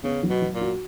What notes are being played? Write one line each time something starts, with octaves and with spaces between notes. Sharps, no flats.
C#3 B3
F#3
B2
F#3
A#2
F#4